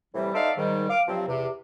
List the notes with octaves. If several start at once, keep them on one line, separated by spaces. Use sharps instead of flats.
A2 C3 E3 G3
D#4 A4 C5 D5 E5 F5
G#2 D#3 G3
F5 D6
G2 C3 F3 F#3 C4
E2 C3